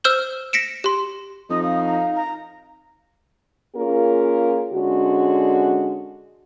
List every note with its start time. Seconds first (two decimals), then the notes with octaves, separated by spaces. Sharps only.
0.04 C5 E6 F6 G6 E7 G7
0.53 A#6 B6 C#7 D7 E7
0.84 G4 C6
1.50 F2 D#4 D#5 D#6
1.63 F5 D#6
1.86 A#5
2.16 A#5
3.75 A#3 C#4 F4 G#4 A#4
4.73 D3 G#3 C#4 F#4